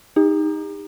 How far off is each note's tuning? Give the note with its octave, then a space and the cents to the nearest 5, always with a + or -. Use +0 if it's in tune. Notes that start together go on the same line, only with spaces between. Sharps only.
D#4 +0 G4 +40